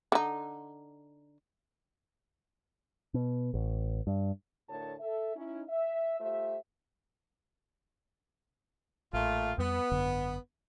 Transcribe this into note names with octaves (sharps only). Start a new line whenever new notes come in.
D3 D#4
B2
A1
G2
D2 A2 D3 A#4 C#5 A5
A4 E5
C#4 D#4 E4
E5
A3 F4 G4 C5 E5
A1 A#2 A3 F4
F2 G3 B3
G#1 F#2 D3